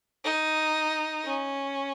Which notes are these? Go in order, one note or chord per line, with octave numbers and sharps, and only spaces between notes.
D#4
C#4